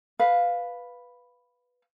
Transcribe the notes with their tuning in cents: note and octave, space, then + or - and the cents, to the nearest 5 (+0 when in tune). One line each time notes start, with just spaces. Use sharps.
B4 +0 F5 +5